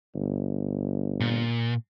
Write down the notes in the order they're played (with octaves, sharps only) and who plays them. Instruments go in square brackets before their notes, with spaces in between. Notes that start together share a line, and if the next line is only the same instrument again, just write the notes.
[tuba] G1
[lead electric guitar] A#2